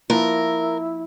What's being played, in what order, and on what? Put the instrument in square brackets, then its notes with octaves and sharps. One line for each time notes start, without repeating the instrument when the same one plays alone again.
[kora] F3 A#3 B4 [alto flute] E4 [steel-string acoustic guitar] A#4